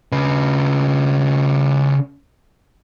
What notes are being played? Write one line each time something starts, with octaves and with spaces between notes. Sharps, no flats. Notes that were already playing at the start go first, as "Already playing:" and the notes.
C#3 B4